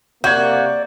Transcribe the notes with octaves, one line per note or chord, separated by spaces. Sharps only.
C3 A#3 F#4 D5 G6 G#6